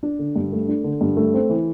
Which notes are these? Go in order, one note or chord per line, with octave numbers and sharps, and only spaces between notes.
D4
D3
G2
A3
D4
D3
G2
A3
C4
E3